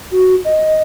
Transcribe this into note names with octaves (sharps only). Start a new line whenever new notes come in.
F#4
D#5